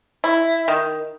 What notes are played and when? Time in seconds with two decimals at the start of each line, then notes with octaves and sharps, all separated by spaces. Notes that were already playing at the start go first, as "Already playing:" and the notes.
0.24 E4
0.68 D#3